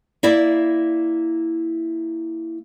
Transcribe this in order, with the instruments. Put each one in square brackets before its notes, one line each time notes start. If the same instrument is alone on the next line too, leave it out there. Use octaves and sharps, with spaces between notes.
[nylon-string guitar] A#3 E4 D5 E5